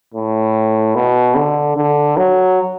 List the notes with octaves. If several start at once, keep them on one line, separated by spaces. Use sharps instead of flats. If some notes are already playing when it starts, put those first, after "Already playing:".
A2
B2
D3
D3
F#3